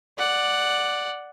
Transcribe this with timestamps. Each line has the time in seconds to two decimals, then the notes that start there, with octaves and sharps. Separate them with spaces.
0.18 D5 F#5